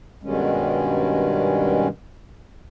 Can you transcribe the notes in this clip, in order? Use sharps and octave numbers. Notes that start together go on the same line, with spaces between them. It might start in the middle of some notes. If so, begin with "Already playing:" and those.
G2 B2 D#3 G3 G#3 C#4